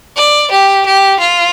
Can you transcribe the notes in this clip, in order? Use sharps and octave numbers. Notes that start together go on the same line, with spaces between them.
D5
G4
G4
F4